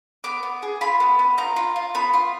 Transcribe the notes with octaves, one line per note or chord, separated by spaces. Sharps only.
B3 D6
B3
G#4
F4 B5
B3
B3
F4 A#5
F4
F4
B3 B5
F4